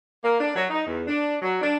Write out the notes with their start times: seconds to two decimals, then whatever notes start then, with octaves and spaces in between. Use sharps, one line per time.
0.24 A#3
0.40 D4
0.55 F#3
0.70 D#4
0.86 E2
1.07 D4
1.42 F#3
1.62 D4